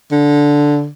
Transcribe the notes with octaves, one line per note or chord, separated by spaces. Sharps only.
D3